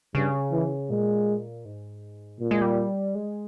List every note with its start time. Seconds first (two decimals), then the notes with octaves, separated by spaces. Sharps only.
0.15 G2 C#3
0.52 E3
0.90 A#2 G#3
1.65 G#2
2.40 A#2 G3
2.51 G#3
2.62 G3
3.15 G#3